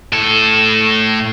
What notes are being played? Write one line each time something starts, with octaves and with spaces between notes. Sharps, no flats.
A2 A4